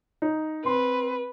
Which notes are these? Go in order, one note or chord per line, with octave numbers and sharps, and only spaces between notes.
D#4
C4 B4 C6